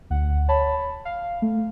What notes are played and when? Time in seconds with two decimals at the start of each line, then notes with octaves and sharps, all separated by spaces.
0.10 D2 F#5
0.48 C#5 A5 B5
1.05 F5
1.42 A3